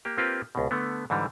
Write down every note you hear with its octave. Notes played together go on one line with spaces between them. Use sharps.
A#3 G4
A#3 C4 F4 G4 B4
C#2 B2
D3 A3 B3
G#2 D3 E3 G3